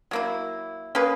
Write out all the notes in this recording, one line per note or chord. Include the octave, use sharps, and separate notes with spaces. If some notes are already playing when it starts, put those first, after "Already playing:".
F#3 A#3 E4
A#3 C#4 G#4 B4